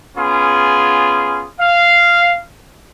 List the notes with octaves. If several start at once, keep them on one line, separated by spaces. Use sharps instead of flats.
B3 C#4 F4 G#4
F5